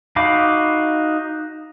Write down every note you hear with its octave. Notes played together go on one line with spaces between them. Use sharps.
D#4 F#4 F5 B5 D6